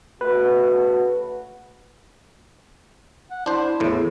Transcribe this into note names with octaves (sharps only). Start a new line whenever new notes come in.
C#3 A3 F#4 B4
F#5
D4 E4 C5
E2 A2